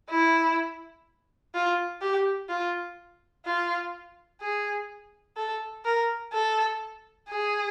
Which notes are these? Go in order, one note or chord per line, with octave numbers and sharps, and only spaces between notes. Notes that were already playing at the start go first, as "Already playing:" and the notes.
E4
F4
G4
F4
F4
G#4
A4
A#4
A4
G#4